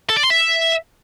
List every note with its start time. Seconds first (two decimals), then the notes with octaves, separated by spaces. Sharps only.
0.10 A4
0.16 D5
0.23 C6
0.30 E5